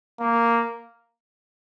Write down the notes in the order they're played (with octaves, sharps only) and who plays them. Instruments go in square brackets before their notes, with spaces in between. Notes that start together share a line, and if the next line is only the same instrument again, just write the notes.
[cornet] A#3